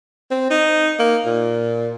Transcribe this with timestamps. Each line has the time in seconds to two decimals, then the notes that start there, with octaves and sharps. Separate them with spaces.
0.31 C4
0.50 D#4
0.99 A#3
1.26 A#2